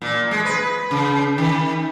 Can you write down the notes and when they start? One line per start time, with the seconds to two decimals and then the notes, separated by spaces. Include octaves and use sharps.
0.02 A#2
0.31 G#3
0.45 B4
0.91 C#3
1.38 D#3